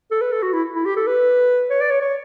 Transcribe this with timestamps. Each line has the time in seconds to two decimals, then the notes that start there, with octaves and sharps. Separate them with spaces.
0.11 A4
0.21 B4
0.32 A4
0.43 F#4
0.53 E4
0.75 E4
0.85 G4
0.96 A4
1.07 B4
1.70 C#5
1.81 D5
1.90 C#5
2.01 C#5